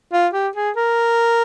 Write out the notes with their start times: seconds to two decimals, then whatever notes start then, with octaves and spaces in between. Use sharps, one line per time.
0.13 F4
0.33 G4
0.56 G#4
0.76 A#4